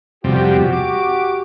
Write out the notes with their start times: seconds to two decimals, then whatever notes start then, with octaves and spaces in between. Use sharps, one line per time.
0.24 F2 C3 G3 F#4 G4
0.73 D6